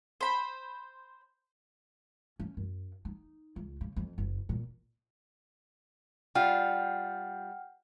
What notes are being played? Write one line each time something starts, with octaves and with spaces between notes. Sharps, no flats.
C5 B5
C#4
F#2
D#4
C#2
C#3
F2
F#1
A#2
G3 F4 F#5 G5 F6